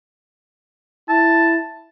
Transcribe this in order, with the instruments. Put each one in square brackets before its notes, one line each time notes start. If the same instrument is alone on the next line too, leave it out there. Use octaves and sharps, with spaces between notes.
[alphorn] E4 [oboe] A5